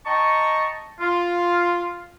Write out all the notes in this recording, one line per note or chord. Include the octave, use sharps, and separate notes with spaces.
D#5 G5 A5 A#5 C#6
F4